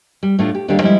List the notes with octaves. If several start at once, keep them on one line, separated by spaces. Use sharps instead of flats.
G3
A2 A3 D4 F4
G4
D#2 D3 G3 D4 G4 F5
F3 G3 G#3 E4